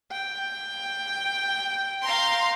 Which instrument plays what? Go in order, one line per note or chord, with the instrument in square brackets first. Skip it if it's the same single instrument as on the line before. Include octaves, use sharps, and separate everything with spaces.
[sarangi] G5
[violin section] F5 A#5 C6